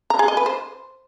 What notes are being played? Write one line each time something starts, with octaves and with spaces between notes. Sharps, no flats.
A#5
G#4
D#5
B4
C5